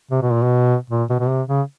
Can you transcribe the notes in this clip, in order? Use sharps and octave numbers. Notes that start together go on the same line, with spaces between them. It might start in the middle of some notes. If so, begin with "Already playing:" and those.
C3
B2
A#2
B2
A#2
B2
B2
C3
C#3